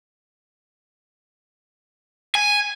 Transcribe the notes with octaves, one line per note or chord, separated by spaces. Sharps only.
G#5